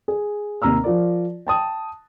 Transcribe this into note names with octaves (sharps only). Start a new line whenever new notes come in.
G#4
D#2 C3 A#5 E6 F6
F3 F4 A#4 D5
G5 A5 D#6